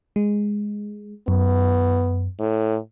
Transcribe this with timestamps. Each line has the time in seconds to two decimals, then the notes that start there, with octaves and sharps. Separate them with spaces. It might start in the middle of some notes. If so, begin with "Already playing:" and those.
0.16 G#3
1.28 F#2 B3
2.40 A2